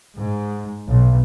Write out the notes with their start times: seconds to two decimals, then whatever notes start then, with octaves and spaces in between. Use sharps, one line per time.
0.18 G#2
0.87 B1